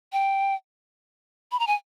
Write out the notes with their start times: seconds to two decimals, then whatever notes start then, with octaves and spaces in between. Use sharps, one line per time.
0.13 G5
1.52 B5
1.59 A#5
1.67 G#5